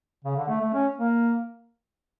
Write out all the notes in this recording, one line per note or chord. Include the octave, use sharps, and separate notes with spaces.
C#3
D3
A3
A3
C#4
A#3